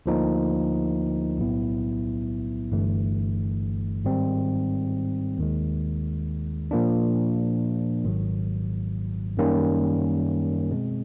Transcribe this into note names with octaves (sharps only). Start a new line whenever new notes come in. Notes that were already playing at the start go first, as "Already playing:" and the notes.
D2 D3 F3 A#3 D#4
B1 A2 F#3 B3 E4
G1 G2 E3 A3
G#2 D#3 G3 C4
D#2 D#3 G#3
A#2 F3 A#3 D4
G#1 G#2 D#3 F#3
F#2 D#3 G3 A#3 C#4
B2 G#3 C4